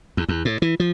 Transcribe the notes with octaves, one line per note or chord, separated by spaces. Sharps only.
E2
E2
A2
E3
F3